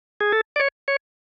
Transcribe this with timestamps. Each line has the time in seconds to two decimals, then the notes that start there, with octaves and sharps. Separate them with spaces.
0.21 G#4
0.32 A4
0.56 D5
0.60 C#5
0.88 C#5